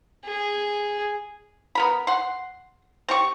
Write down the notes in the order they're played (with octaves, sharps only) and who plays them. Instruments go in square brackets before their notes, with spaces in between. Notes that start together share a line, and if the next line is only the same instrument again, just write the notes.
[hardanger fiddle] G#4
[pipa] B3 A#4 B5
F#5 C6
C4 G4 C#6